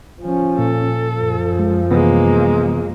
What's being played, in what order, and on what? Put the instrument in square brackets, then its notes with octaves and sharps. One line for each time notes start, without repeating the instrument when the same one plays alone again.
[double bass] F3 C#4
[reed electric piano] A#2 [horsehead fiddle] A4
[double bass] F#2 F3
[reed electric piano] G#3
[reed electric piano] C3 E3 B3 [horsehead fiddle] G#3 A#3